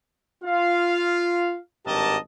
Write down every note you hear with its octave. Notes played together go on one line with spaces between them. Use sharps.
F4 F5
G#1 G2 G4 A#4 D#5 A5